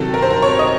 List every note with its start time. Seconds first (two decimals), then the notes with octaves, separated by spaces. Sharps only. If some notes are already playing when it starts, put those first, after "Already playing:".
Already playing: C3 D#3 F#3 A4
0.14 A#4
0.22 C5
0.30 A#4
0.42 C#5
0.59 D#5